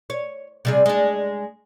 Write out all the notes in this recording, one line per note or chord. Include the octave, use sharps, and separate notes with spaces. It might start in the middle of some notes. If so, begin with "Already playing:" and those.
C#5
C3 G3 G#4
G#3 D4